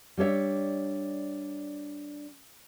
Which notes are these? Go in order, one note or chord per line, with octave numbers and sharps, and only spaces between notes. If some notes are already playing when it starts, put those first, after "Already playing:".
G3 D4 C#5 E5